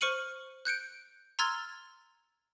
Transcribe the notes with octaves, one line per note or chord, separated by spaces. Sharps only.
C5 C#6 F6 C#7 D#7 F#7
F#6 G6 C#7 D7
A#5 C6 E6 F6 G#6 A6